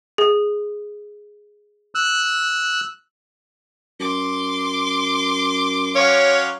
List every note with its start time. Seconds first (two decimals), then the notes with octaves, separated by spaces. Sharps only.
0.18 G#4
1.95 E6 F#6
4.00 F#2 C6 D6
5.95 F#3 C#4 C#5 F5